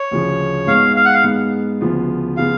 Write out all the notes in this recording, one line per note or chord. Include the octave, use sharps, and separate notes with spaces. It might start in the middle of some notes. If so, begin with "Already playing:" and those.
Already playing: C#5
D2 C#3 F3
G#2 G#3 B3 F5
F5
F#5
F5
G#2 G#3 B3
D2 C#3 F3 B3 F4
C#3 F3 B3 F4 F5